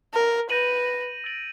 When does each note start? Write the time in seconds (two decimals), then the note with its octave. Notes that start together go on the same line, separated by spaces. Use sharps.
0.14 A#4
0.50 B4 G6 A#6 D#7 F#7
1.24 E6 A6 D7 F#7